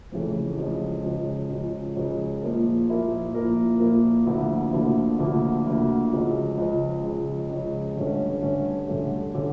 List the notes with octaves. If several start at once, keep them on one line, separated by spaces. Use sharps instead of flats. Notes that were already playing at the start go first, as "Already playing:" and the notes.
F1 F2 C#3 E3 A3
C#2 C#3 F3
C#2 C#3 F3
C#2 C#3 F3
C#2 C#3 F3
A#2 F3 A#3 E4 A#4
A#2 F3 A#3 E4 A#4
A#2 F3 A#3 E4 A#4
A#2 F3 A#3 E4 A#4
D2 D3 F3 A#3 E4
D2 D3 F3 A#3 E4
D2 D3 F3 A#3 E4
D2 D3 F3 A#3 E4
C#2 C#3 F3
C#2 C#3 F3
C#2 C#3 F3
C#2 C#3 F3
G2 D3 A3 C#4
G2 D3 A3 C#4
G2 D3 A3 C#4
D3 A3 C#4